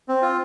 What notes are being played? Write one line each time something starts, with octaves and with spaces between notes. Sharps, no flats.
C4
F4